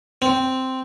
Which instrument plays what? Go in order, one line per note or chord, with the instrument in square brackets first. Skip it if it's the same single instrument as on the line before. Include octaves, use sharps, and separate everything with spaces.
[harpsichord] C4